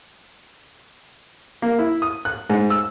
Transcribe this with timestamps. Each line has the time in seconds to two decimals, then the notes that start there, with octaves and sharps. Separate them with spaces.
1.62 A#3
1.79 E4
2.02 D#6
2.25 F#6
2.50 G#2
2.70 E6